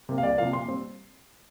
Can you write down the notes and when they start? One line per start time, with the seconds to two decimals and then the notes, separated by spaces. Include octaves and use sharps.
0.09 C3 A#3
0.18 F5
0.23 C2 D5
0.38 C3 F3 A#3 F5
0.53 A#2 C6
0.68 G3 C4